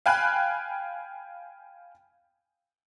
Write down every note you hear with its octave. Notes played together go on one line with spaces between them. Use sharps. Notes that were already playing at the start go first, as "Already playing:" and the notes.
F5 G5 G#5 B5 F#6